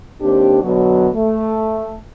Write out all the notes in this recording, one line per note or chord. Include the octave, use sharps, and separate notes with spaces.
D#2 C4 D4 G4
B2 D3 F#3
A3